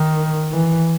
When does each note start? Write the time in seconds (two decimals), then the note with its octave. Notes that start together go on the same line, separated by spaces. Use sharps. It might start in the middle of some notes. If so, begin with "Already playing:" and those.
Already playing: D#3
0.52 E3